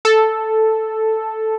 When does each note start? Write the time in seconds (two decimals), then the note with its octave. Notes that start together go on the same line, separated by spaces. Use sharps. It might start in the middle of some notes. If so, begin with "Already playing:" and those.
0.05 A4